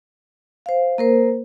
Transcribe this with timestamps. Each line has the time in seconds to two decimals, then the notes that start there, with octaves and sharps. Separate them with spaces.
0.66 C5 F5
0.98 A#3 A#4 C5